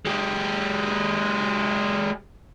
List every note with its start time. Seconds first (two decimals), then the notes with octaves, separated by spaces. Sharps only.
0.05 G#3 G4